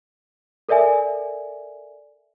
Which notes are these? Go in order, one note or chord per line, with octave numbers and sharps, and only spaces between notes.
A4 A#4 D5 E5 G#5